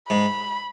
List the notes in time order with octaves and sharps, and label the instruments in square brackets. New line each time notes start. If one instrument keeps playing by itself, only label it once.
[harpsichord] G#2 [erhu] B5